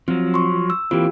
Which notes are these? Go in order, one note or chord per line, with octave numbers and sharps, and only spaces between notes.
F3 F#3 C4
C6 C#6
E6
E3 A#3 C4 F4 G4